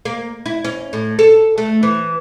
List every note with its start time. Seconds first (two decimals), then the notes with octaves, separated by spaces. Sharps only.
0.05 A#3
0.46 E4
0.64 C#4
0.93 A2
1.19 A4
1.58 A3
1.83 E3